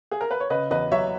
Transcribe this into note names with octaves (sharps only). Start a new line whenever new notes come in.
G#4
A#4
B4
C#5
C#3 B4 D#5
E2 B4 D#5
F#3 C#5 E5